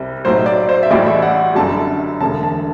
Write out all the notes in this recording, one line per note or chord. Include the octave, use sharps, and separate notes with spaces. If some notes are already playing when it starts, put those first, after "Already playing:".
Already playing: C2 C3 G3
B1 A2 F#3 C5
D5
C5
E5
A1 A2 G3 D5
E5
F#5
G1 F#2 D3 G3 A5
E1 D2 D3 A5
A5